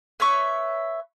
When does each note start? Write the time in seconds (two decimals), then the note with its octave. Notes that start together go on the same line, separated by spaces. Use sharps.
0.20 B4 C#5 E5 C#6